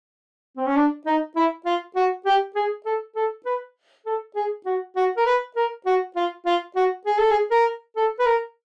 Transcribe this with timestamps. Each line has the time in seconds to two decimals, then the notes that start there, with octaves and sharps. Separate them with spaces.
0.57 C4
0.66 C#4
0.76 D4
1.06 D#4
1.36 E4
1.66 F4
1.96 F#4
2.26 G4
2.55 G#4
2.86 A4
3.16 A4
3.46 B4
4.06 A4
4.36 G#4
4.66 F#4
4.96 F#4
5.17 A#4
5.26 B4
5.56 A#4
5.86 F#4
6.16 F4
6.46 F4
6.76 F#4
7.06 G#4
7.18 A4
7.30 G#4
7.51 A#4
7.96 A4
8.19 B4
8.26 A#4